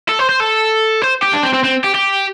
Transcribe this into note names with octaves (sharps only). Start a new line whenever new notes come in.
A4
C5
C5
A4
C5
G4
D4
C4
C4
C4
G4
G4